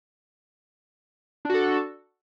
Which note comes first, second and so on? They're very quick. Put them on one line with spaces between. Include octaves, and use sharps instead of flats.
D4 F#4 A4